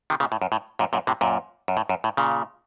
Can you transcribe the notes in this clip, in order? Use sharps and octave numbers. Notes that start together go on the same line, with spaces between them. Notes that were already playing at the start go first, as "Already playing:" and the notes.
C3 D#3
A#2 C#3
A2
F#2
A2
F#2 A#2
F#2 A#2
A2 C3
F#2 A#2
F#2
A2
F#2
A2
A#2 C#3